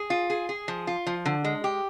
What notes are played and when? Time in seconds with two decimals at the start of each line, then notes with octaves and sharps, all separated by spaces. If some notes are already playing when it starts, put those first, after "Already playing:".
Already playing: G#4
0.10 F4
0.30 G#4
0.49 G#4
0.68 F3
0.87 F4
1.07 F3
1.25 D3
1.44 G#3
1.64 G4